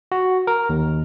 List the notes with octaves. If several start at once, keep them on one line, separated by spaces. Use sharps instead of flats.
F#4
A#4
D#2